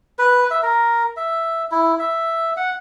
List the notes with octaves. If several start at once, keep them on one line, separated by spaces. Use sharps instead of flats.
B4
E5
A#4
E5
E4
E5
F#5